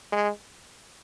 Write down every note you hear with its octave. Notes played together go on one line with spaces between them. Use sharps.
G#3